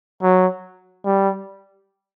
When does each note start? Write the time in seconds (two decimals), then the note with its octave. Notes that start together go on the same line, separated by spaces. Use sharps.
0.22 F#3
1.05 G3